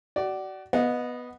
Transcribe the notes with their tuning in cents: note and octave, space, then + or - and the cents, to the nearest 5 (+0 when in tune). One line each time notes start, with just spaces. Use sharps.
F#4 +30 D5 +0
B3 +0 D#5 +0 F#5 -45